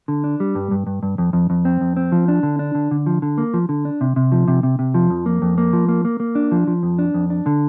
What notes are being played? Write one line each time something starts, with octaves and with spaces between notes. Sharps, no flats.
D3
D4
G3
G2
G2
G2
G2
F2
F2
F2
C4
F2
C4
F3
D4
D3
D4
D3
D3
F3
D3
A#3
F3
D3
D4
C3
C3
F3
C3
C3
C3
F3
F2
A#3
F2
A#3
F3
A#3
A#3
A#3
D4
F3
F3
F2
D4
F2
D4
D3